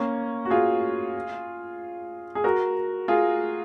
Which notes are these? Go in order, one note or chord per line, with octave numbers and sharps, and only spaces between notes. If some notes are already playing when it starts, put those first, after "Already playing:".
Already playing: A#3 C#4
F#4
F4 G#4
G#4
F#4 A#4
F4 G#4